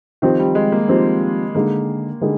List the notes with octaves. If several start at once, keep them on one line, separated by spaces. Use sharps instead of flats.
D#3 F3 C4 D#4 G4
G3
G#3
A#3
F3 C4 D#4 G4
D3 G#3 A#3 D#4 G#4
D3 G3 G#3 D#4 G#4